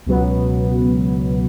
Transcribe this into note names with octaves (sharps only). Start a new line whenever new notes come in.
C#2 B2 F#3 B3